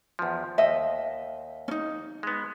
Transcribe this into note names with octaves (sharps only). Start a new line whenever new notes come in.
E2 F3
D#2 D#5 E5
C#4 D#4
G#3 B3